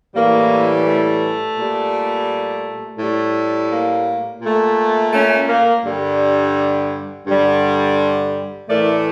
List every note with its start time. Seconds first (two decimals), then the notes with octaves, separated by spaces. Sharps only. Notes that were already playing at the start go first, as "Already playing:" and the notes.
0.15 A2 E3 G3 A#3
0.86 A3
1.57 A#2 G3
2.99 A2 G3
3.70 A#3
4.41 A#2 A3
5.12 A3 C#4
5.48 A#3
5.84 G2 D3 G3
7.26 G2 D3 G3
8.68 A2 E3 A3 A#4 D5